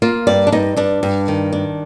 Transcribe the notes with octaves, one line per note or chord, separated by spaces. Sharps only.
A#3 F4
G2 D5
D4
G2 D#4
G2 D4
G2
D#3
D4